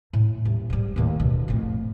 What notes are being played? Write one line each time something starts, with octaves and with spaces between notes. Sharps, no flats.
A2
D#1
G#2 G3
D#2 A2
B2 D3
F2 A2